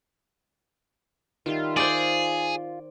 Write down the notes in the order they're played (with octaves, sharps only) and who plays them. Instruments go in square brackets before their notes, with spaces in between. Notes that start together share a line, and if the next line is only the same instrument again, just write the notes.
[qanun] D#3 G3 E5 [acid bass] F4
[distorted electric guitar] G#4 [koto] C5 D5 [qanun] G#5